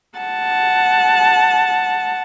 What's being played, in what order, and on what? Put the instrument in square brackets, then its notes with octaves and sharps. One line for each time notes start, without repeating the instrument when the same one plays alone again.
[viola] F#5 A5